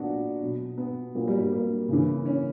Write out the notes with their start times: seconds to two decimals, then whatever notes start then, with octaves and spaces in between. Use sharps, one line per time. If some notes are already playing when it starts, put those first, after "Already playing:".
Already playing: A#2 F#3 B3 D4 F#4
0.41 B2 F#3
0.78 B3
1.15 A#2 F#3 A#3
1.28 G3
1.40 G3
1.52 A#3
1.89 C#3 E3
2.26 C#4